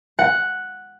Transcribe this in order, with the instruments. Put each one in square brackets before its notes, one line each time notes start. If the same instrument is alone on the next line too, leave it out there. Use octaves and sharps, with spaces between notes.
[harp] F#5